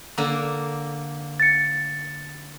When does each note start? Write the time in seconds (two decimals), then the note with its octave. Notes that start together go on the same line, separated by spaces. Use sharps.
0.18 D3 A#3
1.40 A6 C#7